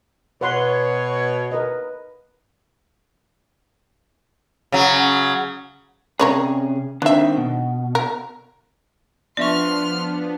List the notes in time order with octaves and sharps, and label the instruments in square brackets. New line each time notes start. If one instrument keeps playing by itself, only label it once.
[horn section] B2 C#5 [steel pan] B4 F#5 C6
[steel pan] A#4 B4 D#5
[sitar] C#3 F#3
[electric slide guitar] C3 C#4 G#4 [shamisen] A#4 C#5 D5
[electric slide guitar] D#3 C4 [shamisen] D4 E5
[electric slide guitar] B2
[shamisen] A#4
[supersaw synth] F3 B3 D4 [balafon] D5 E5 C#6 [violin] C6 F6